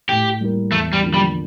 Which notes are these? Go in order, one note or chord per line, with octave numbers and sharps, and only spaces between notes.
A2 G4
G3 A#3 E4 A#4
E2 A3
G3
D3 F3 A#3 D4
G3